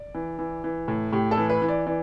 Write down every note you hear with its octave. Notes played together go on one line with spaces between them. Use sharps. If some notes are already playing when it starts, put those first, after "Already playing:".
Already playing: D5
E3
E3
E3
A2
A2 G4
A4
E3
B4
E3
D5
E3 D5